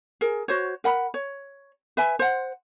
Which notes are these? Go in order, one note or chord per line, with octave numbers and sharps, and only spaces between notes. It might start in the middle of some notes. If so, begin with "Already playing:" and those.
G#4 A#4
F#4 C5 C#5
A#4 F#5 B5
C#5
B4 E5 G#5
C5 F#5